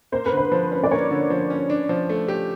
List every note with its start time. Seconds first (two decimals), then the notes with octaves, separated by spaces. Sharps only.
0.12 A#3 C5
0.26 B4
0.32 D3
0.37 C5
0.52 F3
0.71 C#4
0.84 D5
0.91 A#3 C#5
1.10 D3
1.30 F3
1.50 C#4
1.70 D4
1.89 F3
2.09 A3
2.28 G4